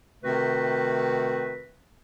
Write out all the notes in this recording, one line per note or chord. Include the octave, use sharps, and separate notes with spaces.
C3 D#3 A3 C4 F#4 B4